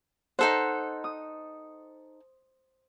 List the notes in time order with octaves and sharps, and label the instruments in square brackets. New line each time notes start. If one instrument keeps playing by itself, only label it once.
[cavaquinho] D#4 A4 F#5 [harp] C5
[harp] D#6